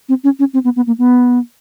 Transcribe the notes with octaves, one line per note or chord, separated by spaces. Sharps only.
C4
C#4
C#4
C4
B3
B3
A#3
B3